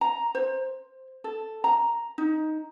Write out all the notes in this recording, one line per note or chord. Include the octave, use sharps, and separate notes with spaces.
A#5
C5
A4
A#5
D#4